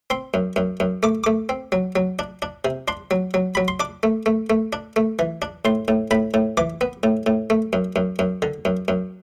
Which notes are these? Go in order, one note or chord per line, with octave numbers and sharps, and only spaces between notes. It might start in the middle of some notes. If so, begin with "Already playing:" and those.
C4 C6
F#2
F#2
F#2
A3 D6
A3 D6
C4
F#3
F#3
D4
D4
C3
D4 C6
F#3
F#3
F#3 B5
C6
D4 D6
A3
A3
A3
D4
A3
E3
D4
A2 C6
A2
A2 B5
A2
E3 D6
B3
A2
A2
A3
F#2
F#2
F#2
D3
F#2
F#2